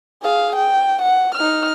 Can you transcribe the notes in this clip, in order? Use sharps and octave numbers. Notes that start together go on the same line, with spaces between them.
G#4 F5
G5
F#5
D#4 F6